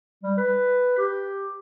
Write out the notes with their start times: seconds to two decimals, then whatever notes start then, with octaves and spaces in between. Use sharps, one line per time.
0.23 G3
0.37 B4
0.98 G4